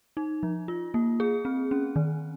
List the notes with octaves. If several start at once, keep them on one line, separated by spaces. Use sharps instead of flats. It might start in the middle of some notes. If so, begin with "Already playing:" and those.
D#4
F3
F4
A#3
G#4
C4
C#4
D#3